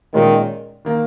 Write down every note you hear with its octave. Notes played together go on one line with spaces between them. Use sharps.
A#2 D#3 G#3 C#4 F4
D#3 A#3